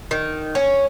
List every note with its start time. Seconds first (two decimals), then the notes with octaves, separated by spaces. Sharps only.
0.11 D#3
0.55 C#4